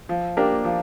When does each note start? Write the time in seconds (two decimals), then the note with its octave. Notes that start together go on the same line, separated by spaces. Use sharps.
0.09 F3
0.37 A#3 D4 G4 A#4
0.65 F3